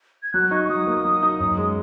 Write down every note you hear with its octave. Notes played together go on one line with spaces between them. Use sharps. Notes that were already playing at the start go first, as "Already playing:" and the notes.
G#6
F#3 F#6
D#4 C#6
C#6
F#3 D#6
A#3
F#3
D#4
F#2
G#3